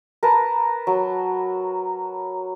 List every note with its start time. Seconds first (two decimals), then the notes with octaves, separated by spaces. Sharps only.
0.23 A#4 B4 A5
0.87 F#3